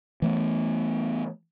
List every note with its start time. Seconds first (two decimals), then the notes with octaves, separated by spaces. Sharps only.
0.22 E3 A3 B3